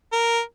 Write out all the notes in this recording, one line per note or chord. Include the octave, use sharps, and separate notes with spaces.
A#4